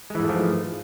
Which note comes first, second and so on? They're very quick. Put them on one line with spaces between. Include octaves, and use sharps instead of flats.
G#3 E3 G#2 A3 F3